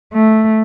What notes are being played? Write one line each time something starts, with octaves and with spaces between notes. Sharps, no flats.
A3